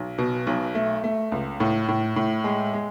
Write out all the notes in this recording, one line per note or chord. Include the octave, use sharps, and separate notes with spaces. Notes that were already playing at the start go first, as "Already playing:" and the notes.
Already playing: B1
B2
B1
A3
A3
C#2
A2
A2
A2
G#3
G#3